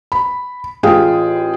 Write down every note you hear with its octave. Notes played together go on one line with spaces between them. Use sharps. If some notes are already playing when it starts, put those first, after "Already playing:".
B5
A1 F4 G#4 F5 G5 D#6